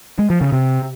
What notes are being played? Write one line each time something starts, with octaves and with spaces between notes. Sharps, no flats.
G#3
F3
C#3
C3